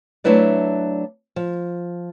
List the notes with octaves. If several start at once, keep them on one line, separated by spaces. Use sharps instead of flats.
F#3 A3 D4 E4 B4 D5
F3